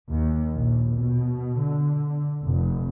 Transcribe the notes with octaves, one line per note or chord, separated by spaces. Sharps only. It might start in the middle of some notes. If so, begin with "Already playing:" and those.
D#2
A#1
B2
D3
F1